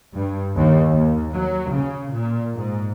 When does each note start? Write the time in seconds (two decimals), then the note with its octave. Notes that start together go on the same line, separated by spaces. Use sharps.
0.14 G2
0.55 D#2
0.89 D#2
1.34 F#3
1.72 C#3
2.14 A#2
2.55 G#2